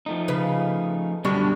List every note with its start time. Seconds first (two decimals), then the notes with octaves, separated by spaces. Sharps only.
0.06 F3 A3 D#4
0.28 C#3 B4
1.25 F#2 B2 D3 G3 D4 G4 C#6